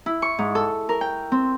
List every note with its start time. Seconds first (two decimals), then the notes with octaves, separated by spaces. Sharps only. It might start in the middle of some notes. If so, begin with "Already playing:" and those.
0.06 E4
0.22 C#6
0.39 G#2
0.55 A4
0.89 A#4
1.01 G5
1.32 C4